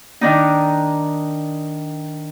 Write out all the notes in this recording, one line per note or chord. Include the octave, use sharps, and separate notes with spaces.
D#3 D4 D#4